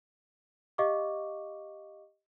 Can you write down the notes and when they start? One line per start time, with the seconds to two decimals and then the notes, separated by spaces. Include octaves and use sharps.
0.78 G4 D#5 F5 C#6 D6